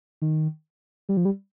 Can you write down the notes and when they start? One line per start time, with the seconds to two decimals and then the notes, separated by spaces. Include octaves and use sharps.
0.22 D#3
1.09 G3
1.17 F3
1.25 G3